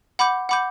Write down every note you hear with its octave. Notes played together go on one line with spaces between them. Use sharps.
F#5 B5 D6 G6
F#5 B5 D6 G6